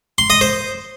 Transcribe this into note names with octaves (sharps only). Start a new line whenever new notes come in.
C6
D#5
C5